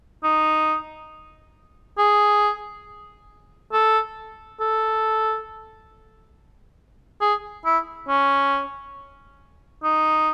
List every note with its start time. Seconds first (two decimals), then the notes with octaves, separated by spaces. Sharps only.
0.23 D#4
1.98 G#4
3.73 A4
4.60 A4
7.21 G#4
7.65 E4
8.08 C#4
9.83 D#4